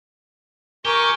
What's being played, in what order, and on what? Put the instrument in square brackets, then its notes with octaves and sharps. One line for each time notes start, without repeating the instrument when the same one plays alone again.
[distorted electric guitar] G4 [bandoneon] A#4 G#5 D6 [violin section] C#6